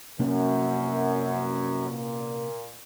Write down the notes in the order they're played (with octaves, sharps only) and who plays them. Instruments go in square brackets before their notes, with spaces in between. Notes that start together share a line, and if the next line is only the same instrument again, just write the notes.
[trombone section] F#2 [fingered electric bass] C3 A#3 C#4
[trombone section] A#2